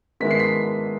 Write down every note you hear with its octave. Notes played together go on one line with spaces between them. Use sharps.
D#3 G#3 B3 E4 B6
C7
B6